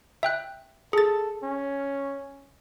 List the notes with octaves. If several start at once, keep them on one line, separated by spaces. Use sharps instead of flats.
E5 G5 F#6
G#4 A4 A6
C#4